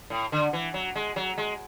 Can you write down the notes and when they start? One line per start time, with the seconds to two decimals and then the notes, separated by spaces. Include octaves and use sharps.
0.10 A2
0.32 D3
0.53 E3
0.74 F#3
0.96 G#3
1.16 F#3
1.38 G#3